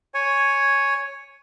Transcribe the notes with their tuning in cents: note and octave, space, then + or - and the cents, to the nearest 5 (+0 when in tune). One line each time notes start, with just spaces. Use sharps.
C#5 +0 G#5 +0